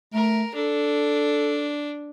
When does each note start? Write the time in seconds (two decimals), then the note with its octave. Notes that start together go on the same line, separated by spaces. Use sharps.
0.14 A3 A#4
0.55 D4 A4